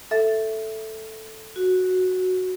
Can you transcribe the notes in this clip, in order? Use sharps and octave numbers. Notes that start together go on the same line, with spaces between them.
A4 E5 A6
F#4